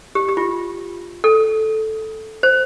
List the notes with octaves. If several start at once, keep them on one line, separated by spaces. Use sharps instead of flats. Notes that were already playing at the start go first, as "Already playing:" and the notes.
G4
G4
F4
A4
C5